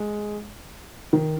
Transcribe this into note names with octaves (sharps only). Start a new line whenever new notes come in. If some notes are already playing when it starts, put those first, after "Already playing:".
Already playing: G#3
D#3